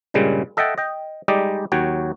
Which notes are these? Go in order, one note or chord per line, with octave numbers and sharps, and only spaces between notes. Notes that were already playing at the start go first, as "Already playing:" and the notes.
G2 A#2 C#3 G3 G#3
A4 D#5 E5 F#5 G5 A5
D#5 G5
G3 G#3 D#4 G4 D5 D#5
D#2 F#3 F#4 C#5 G5